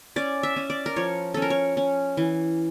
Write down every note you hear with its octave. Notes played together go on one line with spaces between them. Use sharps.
C#4 D5
E5
C#4
D5
A#4
F3 C#5
C#4 A4
A#4
C#5
C#4
E3